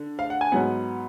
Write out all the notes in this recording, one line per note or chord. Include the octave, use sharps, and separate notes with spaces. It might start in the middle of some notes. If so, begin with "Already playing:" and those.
Already playing: D3
F5
F#5
G#5
G#2 F#3 B3 F#5